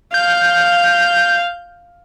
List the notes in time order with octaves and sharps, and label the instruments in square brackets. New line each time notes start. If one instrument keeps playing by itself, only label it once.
[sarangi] F5 [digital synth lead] G6